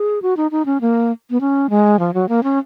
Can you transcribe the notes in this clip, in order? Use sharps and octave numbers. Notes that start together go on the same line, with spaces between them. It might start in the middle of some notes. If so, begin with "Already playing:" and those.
Already playing: G#4
F#4
D#4
D#4
C#4
A#3
B3
C#4
G#3
F3
F#3
A#3
C#4